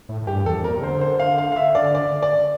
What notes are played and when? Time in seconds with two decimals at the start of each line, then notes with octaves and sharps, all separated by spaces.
0.09 A2
0.22 A2
0.27 G2 G4
0.45 E2 A4
0.55 F2
0.64 A#2 A#4
0.75 C3
0.83 D3 C5
1.01 C5
1.19 F5
1.38 F5
1.52 F5
1.56 E5
1.75 D5
1.95 D5
2.23 D5